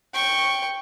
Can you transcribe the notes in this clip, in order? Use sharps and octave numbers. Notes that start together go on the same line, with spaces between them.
G5 C#6